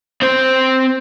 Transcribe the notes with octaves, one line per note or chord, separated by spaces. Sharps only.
C4 C5